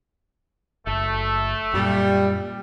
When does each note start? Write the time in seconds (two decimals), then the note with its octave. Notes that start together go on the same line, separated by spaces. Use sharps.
0.87 F#1 A3
1.74 F#2 A#2 G3